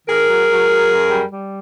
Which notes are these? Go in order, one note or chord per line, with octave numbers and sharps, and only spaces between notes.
D#3 G#4 A#4
F#3
F#3
F#3
F#2
G3
G3